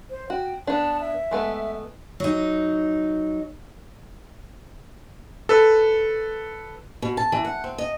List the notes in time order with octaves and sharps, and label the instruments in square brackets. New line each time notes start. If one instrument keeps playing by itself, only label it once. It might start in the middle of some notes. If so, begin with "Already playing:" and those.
[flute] C5
[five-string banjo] F#4 [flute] G5
[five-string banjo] B3 D4 [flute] A5
[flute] E5
[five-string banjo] G#3 A3 B3
[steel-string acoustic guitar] F#3 D#4
[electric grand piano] A4 B4
[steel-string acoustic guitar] B2
A5
E3
F#5
C4
D#5